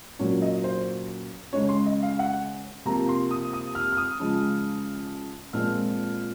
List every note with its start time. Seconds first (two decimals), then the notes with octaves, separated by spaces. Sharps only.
0.19 A#2 F#3 C#4 C#5
0.42 D#5
0.64 C5
1.53 C#3 G#3 C#4 C#5
1.69 C6
1.86 D#5
2.03 F5
2.19 F#5
2.86 C3 F3 A#3 F4 A#5
3.09 C6
3.31 D#6
3.53 D#6
3.75 F6
3.92 F6
3.97 D#6
4.19 C#3 F3 G#3
5.53 A#2 F3 G#3 C4 F6